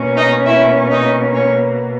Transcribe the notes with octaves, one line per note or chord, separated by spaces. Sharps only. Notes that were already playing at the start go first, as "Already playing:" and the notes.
Already playing: B2 A#3 C#4
D#4 D#5
E4 E5
D#4 D#5
C#4 C#5